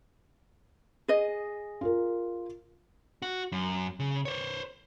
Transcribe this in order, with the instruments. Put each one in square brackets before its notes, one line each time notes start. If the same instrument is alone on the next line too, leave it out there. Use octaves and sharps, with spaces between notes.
[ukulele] G#4 D#5
[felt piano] F4 A#4
[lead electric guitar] F#4
F#2
C#3
C5 C#5